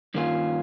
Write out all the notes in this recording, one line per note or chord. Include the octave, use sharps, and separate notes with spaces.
G2 D#3 A#3 C#4 F4